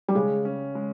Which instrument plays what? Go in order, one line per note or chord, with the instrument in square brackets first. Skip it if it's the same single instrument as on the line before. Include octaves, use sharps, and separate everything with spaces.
[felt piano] G3
[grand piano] C#3 [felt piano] G#3
[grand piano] C#4
G#3